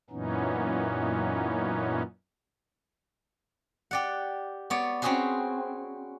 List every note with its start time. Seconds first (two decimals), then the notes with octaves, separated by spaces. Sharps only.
0.10 F#2 A#2 E3 B3 C#4 D#4
3.91 G4 D5 F#5
4.70 B3 C#5 D5
5.02 C4 C#4 F#4 G#4 B4 C5